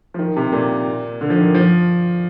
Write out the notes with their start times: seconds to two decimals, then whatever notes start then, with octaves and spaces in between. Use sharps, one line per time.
0.14 F3
0.19 D#3
0.37 C3
0.52 A#2
1.21 D3
1.30 F3
1.38 D#3
1.55 F3